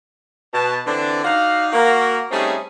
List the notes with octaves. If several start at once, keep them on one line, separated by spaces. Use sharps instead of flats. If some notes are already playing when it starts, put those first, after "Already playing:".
B2 A5
D3 E3 C4 D4
D#4 F#4 D5 F5
A#3 F#4 A#4
G3 A3 C4 C#4 D#4 G#4